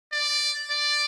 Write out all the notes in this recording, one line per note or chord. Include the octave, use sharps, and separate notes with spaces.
D5
D5